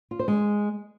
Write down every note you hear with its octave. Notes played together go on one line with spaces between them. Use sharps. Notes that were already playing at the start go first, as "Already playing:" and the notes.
F4
C5
G#3